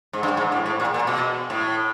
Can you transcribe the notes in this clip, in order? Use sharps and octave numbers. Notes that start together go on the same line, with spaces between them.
G#2
G2
G#2
A2
A2
A#2
A#2
B2
A2